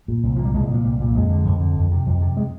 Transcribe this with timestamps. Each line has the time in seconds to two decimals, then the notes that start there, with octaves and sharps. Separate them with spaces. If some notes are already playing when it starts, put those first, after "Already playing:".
0.08 A#2
0.23 C2
0.36 A#2 F3
0.45 G3
0.53 C2 G#3
0.69 A#2 F3
0.84 C2 G3
1.00 A#2
1.15 F2 G#3
1.30 D3
1.45 F2
1.60 D3
1.76 F2
1.91 C3
2.06 F2
2.21 C3
2.37 G#3